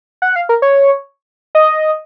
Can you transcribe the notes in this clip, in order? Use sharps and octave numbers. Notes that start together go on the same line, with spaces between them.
F#5
F5
A#4
C#5
D#5